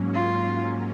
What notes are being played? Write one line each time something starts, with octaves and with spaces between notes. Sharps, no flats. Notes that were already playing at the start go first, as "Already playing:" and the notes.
Already playing: G#2 F#3 A#3 C#4
F4